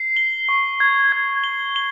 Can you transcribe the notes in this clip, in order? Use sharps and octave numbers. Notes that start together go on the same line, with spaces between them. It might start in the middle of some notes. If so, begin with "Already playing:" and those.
Already playing: C7
G7
C#6
G#6
G#6
G7
G7